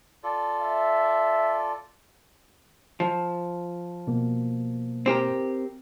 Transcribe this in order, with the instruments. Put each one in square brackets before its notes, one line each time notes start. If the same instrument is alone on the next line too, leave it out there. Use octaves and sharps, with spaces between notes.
[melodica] F4 A4 D5
[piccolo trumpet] E5
[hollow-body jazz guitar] F3
[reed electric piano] B2 A#3
[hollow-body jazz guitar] C4 G4 A#4